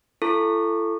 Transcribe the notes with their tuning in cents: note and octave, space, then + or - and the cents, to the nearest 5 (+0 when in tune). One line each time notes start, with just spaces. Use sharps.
E4 +45 A4 +0 C#6 +0